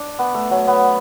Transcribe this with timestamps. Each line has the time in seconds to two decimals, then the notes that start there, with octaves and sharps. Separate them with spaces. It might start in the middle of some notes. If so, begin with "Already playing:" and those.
Already playing: D4
0.19 B3
0.34 A3
0.51 F#3
0.67 B3